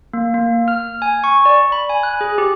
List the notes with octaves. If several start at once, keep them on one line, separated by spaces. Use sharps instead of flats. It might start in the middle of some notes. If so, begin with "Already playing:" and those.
A#3
A#3
F6
G#5
C#6
D5
B5
G#5
F#6
G#4
G4